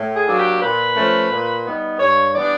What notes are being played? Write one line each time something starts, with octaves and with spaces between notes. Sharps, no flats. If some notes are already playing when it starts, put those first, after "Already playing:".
Already playing: A2
G#4
F#3 A#3 D4
G4
A#2 B4
F3 A3 C#4
A#2
G3 B3 D#4
G2 C#5
E3 G3 B3 D4 D5